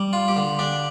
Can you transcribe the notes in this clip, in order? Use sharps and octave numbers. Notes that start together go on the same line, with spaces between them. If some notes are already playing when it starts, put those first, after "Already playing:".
Already playing: G3
F4
G4
D3
D4 G4